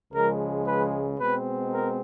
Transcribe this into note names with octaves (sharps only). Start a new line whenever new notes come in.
C#2 C#3 F3 G#3 A#4
B4
B2 G#3 C4 B4
A#4